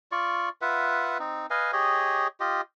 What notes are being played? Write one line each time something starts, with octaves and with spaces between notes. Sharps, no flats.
F4 D5 C#6
F4 B4 E5 F#5
C4 D#4
B4 D#5 F5 G#5
G4 G#4 C#5 D#5
F4 G4 D#5